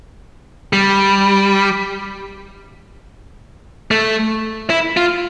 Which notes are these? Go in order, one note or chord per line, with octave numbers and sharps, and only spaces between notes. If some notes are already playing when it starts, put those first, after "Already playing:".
G3
A3
E4
F4